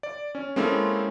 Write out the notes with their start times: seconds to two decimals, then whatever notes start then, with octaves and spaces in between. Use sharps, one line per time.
0.03 D5
0.35 C#4
0.56 G#3 A#3 C4 C#4 E4 A4